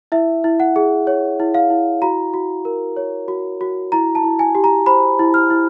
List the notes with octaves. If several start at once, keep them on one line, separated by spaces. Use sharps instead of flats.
E4 E5
E4
F#5
G#4
C#5
E4
F5
E4
F#4 A#5
F#4
A#4
C#5
F#4
F#4
E4 A#5
A5
E4
G#5
G4
A#5
C5 B5
E4
F6
E4